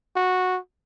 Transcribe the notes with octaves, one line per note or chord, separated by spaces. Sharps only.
F#4